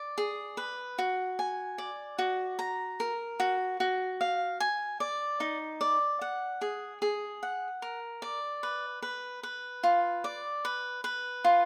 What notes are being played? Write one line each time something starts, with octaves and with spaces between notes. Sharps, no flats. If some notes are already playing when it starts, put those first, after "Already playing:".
Already playing: D5
G#4
B4
F#4
G#5
D5
F#4
A#5
A#4
F#4
F#4
F5
G#5
D5
D#4
D5
F#5
G#4
G#4
F#5
A#4
D5
B4
B4
B4
F4
D5
B4
B4
F4